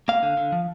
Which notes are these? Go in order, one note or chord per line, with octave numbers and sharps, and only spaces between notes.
A#3 F5
D3
D3
F3